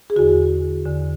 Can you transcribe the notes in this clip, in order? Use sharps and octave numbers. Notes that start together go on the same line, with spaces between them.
G#4
E2 D3 F#4
E2 D3